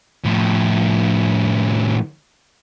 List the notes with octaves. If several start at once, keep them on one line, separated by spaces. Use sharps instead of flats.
A2 F3